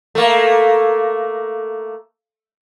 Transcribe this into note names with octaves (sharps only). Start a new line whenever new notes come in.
A3 A#3